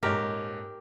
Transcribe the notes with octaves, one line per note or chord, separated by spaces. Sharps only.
D#1 G#2 G4 A#4 C#5